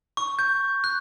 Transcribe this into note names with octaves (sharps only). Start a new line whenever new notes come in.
C#6
G6
F#6